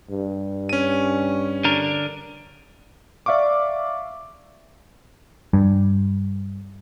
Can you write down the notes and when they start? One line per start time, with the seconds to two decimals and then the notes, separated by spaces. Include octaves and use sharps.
0.10 G2
0.69 C#4 D#7
1.64 D3 D4 A#4
3.26 D5 E5 F5 C#6 D6
5.53 G2